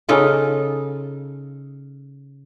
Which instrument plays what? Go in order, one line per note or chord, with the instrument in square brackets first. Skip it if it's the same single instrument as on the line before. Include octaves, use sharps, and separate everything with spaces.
[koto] C#3 D#4 F4 A4